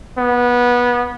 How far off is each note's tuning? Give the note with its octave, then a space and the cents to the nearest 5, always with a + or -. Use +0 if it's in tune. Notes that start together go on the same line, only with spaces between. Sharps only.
B3 -20